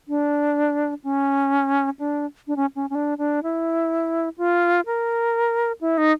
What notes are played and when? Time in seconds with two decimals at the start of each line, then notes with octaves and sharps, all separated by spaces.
0.08 D4
1.04 C#4
1.99 D4
2.47 D4
2.56 C#4
2.76 C#4
2.90 C#4
2.95 D4
3.18 D4
3.43 E4
4.38 F4
4.86 A#4
5.81 E4
5.98 D#4